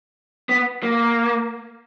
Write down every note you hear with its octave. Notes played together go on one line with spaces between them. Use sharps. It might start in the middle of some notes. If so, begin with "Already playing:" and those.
B3
A#3